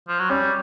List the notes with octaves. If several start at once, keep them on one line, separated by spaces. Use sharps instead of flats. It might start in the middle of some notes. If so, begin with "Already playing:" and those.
F3
F#3
G3 C#4